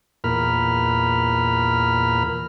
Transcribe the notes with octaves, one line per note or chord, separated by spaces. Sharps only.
E2 A#2 A#4 B5 F6